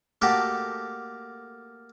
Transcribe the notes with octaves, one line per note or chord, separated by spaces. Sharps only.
A3 A#3 F#4 G4 A4